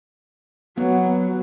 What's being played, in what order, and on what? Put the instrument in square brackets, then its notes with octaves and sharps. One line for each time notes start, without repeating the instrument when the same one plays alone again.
[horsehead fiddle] F#3 [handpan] B3